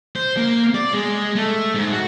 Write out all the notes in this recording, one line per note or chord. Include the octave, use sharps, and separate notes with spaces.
C5
A#3
D5
G#3
A3
G#2
F#4